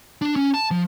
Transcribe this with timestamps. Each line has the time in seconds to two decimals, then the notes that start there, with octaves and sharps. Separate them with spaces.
0.22 D4
0.36 C#4
0.54 A5
0.71 F3